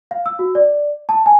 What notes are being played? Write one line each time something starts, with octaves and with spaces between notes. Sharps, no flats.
F5
E6
F#4
D5
A5
G#5